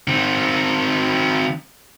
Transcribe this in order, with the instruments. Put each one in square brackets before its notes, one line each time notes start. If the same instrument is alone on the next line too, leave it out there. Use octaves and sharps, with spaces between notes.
[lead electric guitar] D#3 C4